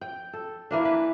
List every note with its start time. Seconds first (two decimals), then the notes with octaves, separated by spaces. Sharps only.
0.01 G5
0.33 A4
0.71 E3 A#3 D4
0.85 B4